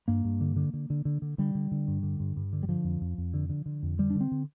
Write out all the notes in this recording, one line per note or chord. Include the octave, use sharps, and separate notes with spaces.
G2 A#3
G2
D3
D3
D3
D3
D3
D3
D3 G3
D3
D3
G2
D3
G2
G2
D3
G3
D3 F3
F2
F2
F2
D3
D3
D3
F2
D3 G3
D3 D4
C4
D3